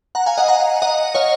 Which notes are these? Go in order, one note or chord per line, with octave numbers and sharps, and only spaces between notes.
F#5 A#5
F5 G#5
D#5 F#5
F#5 A#5
D#5 F#5
C#5 F5